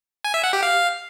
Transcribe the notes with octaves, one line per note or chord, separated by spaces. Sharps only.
G#5
E5
F#5
G4
F5